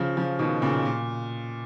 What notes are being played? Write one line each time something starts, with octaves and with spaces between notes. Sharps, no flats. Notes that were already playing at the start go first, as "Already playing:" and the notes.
Already playing: C#3 F3
C#3 F3
B2 D#3
A#2 C#3
A#2